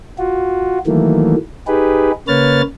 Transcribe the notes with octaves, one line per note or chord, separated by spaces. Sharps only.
F4 F#4
D#3 E3 F#3 A3 A#3
D#4 G4 G#4 B4
C#3 A#3 B4 C#5 F6 A6